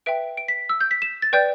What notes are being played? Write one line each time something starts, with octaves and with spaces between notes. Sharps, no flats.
B4 E5 G5 D7
D7
B6
E6
G6
B6
E7
A6
B4 D5 G5 G6